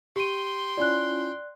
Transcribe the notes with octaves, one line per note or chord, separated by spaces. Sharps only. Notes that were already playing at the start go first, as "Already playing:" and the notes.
G4 G5 C6 D#7
C#4 E4 F4 D5 F#6